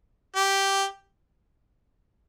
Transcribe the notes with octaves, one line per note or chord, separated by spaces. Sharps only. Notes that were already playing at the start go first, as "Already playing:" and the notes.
G4